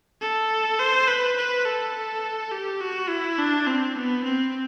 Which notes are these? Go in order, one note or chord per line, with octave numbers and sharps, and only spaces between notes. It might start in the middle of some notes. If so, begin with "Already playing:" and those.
A4
C5
B4
B4
A4
G4
F#4
E4
D4
C4
B3
C4